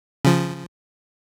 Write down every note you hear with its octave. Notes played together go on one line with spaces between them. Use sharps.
C#3 F3